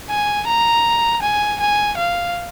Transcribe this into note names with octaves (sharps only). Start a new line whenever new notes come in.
G#5
A#5
G#5
G#5
F5